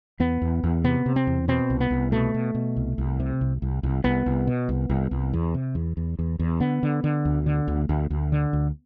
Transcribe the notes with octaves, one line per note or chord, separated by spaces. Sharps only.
E2 B3
E2
E2
C3 B3
C3
C4
E2
B2 C4
C2
B3
C2
B2 A3
B2
B2
C2
C2
C3
C2
C2
C2
C2 B3
C2
B2
C2
C2
C2
E2
C3
E2
E2
E2
E2
D3 B3
D3
D3
D2
D3
D2
D2
D2
D3
D2